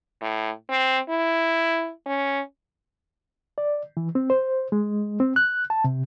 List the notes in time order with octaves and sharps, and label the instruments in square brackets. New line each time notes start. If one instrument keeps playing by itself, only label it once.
[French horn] A2
C4
E4
C#4
[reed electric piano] D5
E3
C4
C5
G#3
C4
F#6
A5
C3